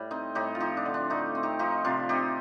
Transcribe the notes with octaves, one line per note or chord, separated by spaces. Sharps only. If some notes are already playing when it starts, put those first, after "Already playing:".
Already playing: A2 G3
C4 D#4
A2 D#4 G4
F4
F3 D#4 G4
D4
D3
D4
A3 D#4
C4
D#4 G4
F3 D#4 G4
C3 D4 F4
C4 D#4 G4